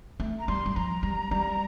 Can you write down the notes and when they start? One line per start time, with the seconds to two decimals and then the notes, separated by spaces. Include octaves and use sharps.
0.20 A3
0.39 A#5
0.48 G3 C6
0.66 G3
0.76 F3 A#5
1.03 G3
1.31 G3